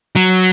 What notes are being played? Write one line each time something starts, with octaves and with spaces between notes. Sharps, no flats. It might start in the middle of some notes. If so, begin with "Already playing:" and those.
F#3